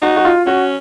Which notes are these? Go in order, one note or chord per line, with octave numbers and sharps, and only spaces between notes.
D#4 F#4
F#4
F4
C#4 F#4